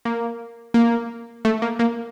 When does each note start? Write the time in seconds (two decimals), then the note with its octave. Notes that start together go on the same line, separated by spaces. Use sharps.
0.05 A#3
0.74 A#3
1.45 A3
1.62 A#3
1.79 A#3